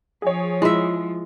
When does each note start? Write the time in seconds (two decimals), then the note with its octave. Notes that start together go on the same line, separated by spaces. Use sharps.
0.22 F3 G#4 C#5
0.62 G#3 E4 F4 E5